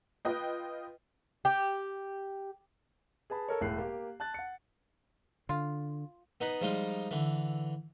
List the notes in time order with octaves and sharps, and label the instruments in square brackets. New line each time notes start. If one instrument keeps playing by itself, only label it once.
[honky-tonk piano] F4 B4 D#5 G5
[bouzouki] G4
[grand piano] G#4 B4 A5 B5
A4 A#4 C#5
E1 A2 F#6 C7
A#3 G4
A5 F#6 A6
F#5 C#7
[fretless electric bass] D3 [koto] F4
[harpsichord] B3 D#4 B4
F3 G3 G#3 D#4 F4
D3 E3